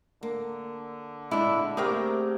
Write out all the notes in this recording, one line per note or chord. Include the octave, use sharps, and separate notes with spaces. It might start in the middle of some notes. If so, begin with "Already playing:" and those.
D3 A#3
A#2 G#3 D4 E4
C3 A3 A#3 D4 G4 G#4 A#4 G5